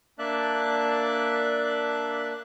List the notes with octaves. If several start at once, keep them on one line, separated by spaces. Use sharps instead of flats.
A#3 D4 D5 E5 A5 F#6